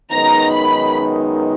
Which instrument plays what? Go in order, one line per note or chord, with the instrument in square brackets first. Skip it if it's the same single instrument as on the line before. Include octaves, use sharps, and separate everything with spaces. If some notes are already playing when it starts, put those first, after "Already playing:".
[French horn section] F#2 D#3 G#3 B3 D#4 [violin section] A#5
[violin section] B5